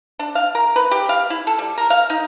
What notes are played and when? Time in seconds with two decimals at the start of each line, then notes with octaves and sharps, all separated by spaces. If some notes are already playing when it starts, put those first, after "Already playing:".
0.19 D4
0.35 F5
0.55 A#4
0.76 B4
0.91 G4
1.09 F5
1.30 E4
1.47 A4
1.59 G3
1.77 A#4
1.90 F5
2.10 D#4